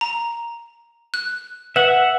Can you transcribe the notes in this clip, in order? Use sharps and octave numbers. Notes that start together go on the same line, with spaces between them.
A#5
F#6
B4 E5 F#5